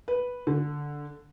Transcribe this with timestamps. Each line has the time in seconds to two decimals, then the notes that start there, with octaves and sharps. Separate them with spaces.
0.08 B4
0.47 D3